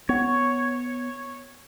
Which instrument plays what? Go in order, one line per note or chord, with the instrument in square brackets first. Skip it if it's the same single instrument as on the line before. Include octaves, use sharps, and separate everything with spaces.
[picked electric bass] B3 [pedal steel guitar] C#5